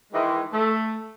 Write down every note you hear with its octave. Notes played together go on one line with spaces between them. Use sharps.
D#3 E3 G#3
A3